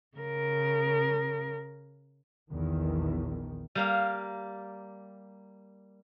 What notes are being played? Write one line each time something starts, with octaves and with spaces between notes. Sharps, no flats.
C#3 A#4
A#1 E2 D#3
G3 A#3 F5